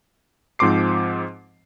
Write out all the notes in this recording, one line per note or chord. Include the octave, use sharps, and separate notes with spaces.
G#2 F3 C4 C6 D6 C7